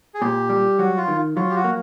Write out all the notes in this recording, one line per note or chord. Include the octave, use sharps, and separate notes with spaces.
G#4
A#2 G4
G3
F#3 F#4
F4
D#3
F#3 F4
G4
F#4
A#3